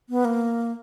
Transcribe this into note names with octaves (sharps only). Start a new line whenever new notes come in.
B3
A#3